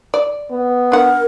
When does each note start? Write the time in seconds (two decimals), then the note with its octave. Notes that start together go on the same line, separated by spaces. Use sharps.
0.14 D5
0.51 B3
0.92 D4 A#4 F#5